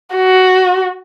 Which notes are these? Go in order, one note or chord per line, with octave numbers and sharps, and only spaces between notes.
F#4